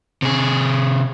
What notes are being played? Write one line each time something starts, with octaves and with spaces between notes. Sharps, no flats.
C3 G#4